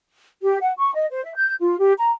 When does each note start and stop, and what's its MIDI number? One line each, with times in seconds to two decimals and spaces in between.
0.42 0.58 67
0.61 0.72 78
0.77 0.93 85
0.95 1.06 75
1.10 1.23 72
1.24 1.34 76
1.36 1.54 91
1.60 1.76 65
1.79 1.93 67
1.98 2.11 82